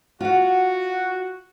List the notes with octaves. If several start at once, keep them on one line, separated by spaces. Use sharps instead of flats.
F4 F#4 F#5